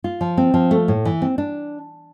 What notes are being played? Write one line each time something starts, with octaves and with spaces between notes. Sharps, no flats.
F4
F3
C4
F3
A3
A2
E3
C4
D4